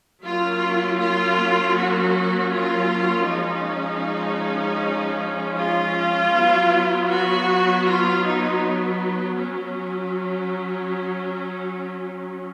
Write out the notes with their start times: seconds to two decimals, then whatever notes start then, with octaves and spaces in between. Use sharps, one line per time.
0.23 F#3 A#3 C#4 F4
0.99 F4
1.75 F#4
2.52 F4
3.28 F3 G#3 C#4 D#4
5.57 F4
6.32 F#3 B3
7.09 F#4
7.85 F4
8.24 D#4
9.38 F#3 C#4